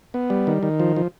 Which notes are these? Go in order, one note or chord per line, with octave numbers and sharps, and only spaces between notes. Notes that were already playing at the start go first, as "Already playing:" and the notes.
B3
G3
D#3
D#3
F3
F3